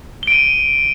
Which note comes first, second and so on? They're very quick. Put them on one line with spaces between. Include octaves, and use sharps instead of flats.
G7 D7 D#7